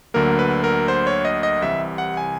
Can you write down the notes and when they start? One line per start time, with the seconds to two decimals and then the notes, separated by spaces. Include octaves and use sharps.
0.14 D2 D3 F#3 A#3 A#4
0.39 B4
0.64 A#4
0.88 C5
1.07 C#5
1.25 D#5
1.43 D#5
1.62 C2 C3 E3 E5
1.98 F#5
2.17 G#5